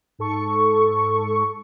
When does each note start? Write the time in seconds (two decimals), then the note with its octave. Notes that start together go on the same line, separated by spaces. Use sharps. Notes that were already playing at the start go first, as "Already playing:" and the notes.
0.19 G#2 A4 C#6